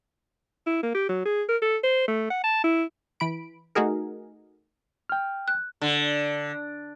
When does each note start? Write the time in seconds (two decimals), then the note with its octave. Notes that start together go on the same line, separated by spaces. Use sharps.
0.67 E4
0.83 A#3
0.95 G4
1.09 F#3
1.25 G#4
1.49 A#4
1.62 A4
1.83 C5
2.08 A3
2.30 F#5
2.44 A5
2.64 E4
3.20 E3 B5 D7
3.75 A3 D#4 F#4 G#4 A#4
5.09 G5 F6
5.48 F#6
5.81 D3